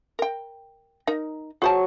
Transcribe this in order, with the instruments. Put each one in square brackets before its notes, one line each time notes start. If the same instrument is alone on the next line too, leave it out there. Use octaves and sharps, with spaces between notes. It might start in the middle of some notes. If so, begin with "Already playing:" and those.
[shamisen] A#4 G5
D#4 A#4
[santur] F#3 C#6 [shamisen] G#4 C5 A5